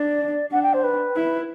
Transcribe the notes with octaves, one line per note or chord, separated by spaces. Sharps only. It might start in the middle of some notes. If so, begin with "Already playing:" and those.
Already playing: D4 D5
D4 F#5
G5
C5
B4
E4